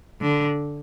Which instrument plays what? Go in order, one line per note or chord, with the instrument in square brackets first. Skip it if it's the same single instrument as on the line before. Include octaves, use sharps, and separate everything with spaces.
[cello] D3